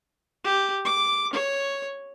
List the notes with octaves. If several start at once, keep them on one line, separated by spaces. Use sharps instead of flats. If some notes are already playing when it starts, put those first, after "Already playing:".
G4
D6
C#5